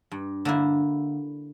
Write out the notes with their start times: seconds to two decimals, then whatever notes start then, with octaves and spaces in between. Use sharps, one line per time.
0.11 G2
0.45 D3 A#3 E4